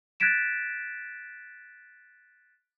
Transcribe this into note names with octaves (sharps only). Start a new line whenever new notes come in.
F#6 G#6 A6 B6 D7 E7